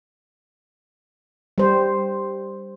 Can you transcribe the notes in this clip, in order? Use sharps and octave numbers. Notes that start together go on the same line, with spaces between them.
G3 C5